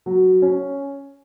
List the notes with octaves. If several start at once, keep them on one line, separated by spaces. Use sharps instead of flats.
F#3
C#4